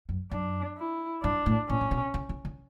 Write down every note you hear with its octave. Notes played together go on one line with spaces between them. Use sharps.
F#2
F#2 D4
E4
G2 D4
A2
A2 C#4
A2
B2
C#3
C#3
D3